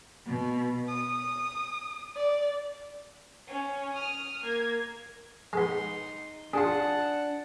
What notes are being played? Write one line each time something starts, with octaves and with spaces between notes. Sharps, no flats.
B2
D#6
D5
C#4
D#6 F6
A#3 G#6
G#3 B3 D#4 C6
D4 F4 G#4 F#5 A5